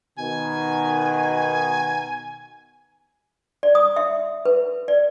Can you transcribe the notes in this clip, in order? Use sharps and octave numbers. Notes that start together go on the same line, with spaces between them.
B2 D#3 G#5
D5
D#6
E5
B4
D5